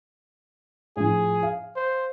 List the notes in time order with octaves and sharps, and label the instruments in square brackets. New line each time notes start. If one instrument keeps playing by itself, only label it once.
[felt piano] A2 F3 [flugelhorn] G#4
[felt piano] F5
[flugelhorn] C5